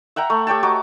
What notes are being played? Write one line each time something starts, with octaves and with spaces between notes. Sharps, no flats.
E5 F#5 G5 A#5
A3
G4 C#5 G5 A5
F#4 D#5 A#5 D6